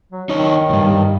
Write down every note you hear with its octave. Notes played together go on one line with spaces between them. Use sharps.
F#3
D#3 D#4 C#5
D2 G2